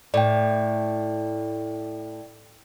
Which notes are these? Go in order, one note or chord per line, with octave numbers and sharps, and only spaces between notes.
A2 D5 G5